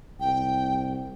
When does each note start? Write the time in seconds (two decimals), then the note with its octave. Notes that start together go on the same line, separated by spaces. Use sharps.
0.20 C2 G5